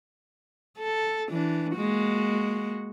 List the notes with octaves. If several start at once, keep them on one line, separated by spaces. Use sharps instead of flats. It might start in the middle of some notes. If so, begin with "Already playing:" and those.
A4
E3 D4
G#3 A#3 F#4